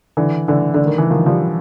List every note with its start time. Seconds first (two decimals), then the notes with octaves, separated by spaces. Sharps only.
0.17 D3 E3
0.48 D3 E3
0.74 D3
0.86 D#3
0.98 E3
1.10 D#3 F3
1.26 F3 G3